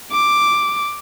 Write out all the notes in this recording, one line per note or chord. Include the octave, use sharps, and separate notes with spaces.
D6